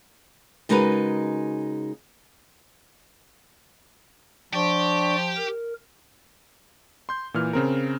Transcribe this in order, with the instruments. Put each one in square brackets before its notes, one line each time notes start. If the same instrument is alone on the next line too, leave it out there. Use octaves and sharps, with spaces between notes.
[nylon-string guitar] C#3 G#3 D#4 F#4 A#4 B4
[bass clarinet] F3 [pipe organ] D4 D5 C#6 [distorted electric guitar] G4
[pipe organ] A#4
[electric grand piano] C6 G6
A#2 E3 F6
C#3 C4 A#4